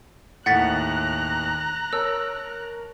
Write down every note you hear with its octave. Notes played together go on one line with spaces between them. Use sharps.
D#2 A2 F#5 A#5 F#6 A6 B6
A#4 C#5 A5 E6